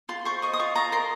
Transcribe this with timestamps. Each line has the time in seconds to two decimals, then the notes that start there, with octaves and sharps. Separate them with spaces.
0.09 F4 C6
0.25 C5 C#6
0.42 D#5 C#6
0.53 D#6
0.59 F4 C#6
0.75 F4 A#5
0.92 A#4 C6